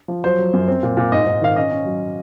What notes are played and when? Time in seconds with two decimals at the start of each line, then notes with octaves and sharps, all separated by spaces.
0.08 F3
0.24 F#3 C5
0.38 F#3
0.53 F#2
0.68 C4
0.83 A#2
0.97 A#2
1.12 G#2 D#5
1.26 G#2
1.41 D#3 F5
1.56 C#4 D#5
1.71 C#4
1.85 F#3